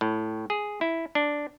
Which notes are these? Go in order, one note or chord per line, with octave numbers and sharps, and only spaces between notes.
A2
G#4
E4
D4